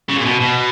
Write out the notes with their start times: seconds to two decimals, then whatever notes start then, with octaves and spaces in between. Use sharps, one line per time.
0.09 C#3
0.18 A#2
0.25 B2
0.41 B2